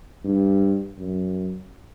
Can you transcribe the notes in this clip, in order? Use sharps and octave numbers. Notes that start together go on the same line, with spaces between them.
G2
F#2